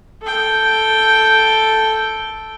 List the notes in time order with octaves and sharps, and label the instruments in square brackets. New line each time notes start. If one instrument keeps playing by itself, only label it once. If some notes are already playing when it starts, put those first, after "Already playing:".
[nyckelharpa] A4 G5